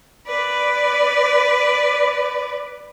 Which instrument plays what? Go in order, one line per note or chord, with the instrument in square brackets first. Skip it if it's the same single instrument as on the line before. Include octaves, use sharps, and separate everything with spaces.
[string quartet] B4 D5